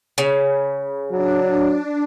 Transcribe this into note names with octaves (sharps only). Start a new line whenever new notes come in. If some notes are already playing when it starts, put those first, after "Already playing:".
C#3
F#3 D4